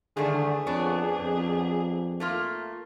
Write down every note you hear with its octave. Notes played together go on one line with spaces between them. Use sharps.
G2 D3 D#3 A3 G#4
F2 B3 D4 C#5
F2
A3 A#3 F4